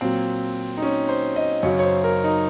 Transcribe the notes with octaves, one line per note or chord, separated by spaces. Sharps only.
A#2 F#3 C4
D#4
C#4
C5
D#5
F#2 C#3 F#3 C#5
C#5
C5
A#4
D#4